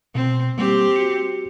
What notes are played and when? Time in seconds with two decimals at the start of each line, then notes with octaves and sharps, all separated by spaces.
0.15 B2 C4
0.58 G3 A#3 C4 G4
0.96 F#4 C#7